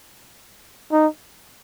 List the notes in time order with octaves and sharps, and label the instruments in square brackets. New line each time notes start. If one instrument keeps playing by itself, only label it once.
[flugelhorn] D#4